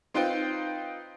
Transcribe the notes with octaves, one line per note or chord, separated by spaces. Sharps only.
C4 D#4 F4 B4 C5 G5